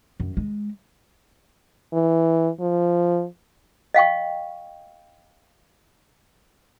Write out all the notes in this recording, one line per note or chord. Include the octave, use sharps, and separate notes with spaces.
F#2
G#3
E3
F3
D#5 F5 G5 C#6